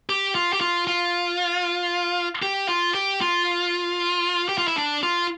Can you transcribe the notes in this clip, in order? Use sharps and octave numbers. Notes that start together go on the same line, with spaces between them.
G4
F4
G4
F4
F4
G4
F4
G4
F4
G4
F4
E4
D4
F4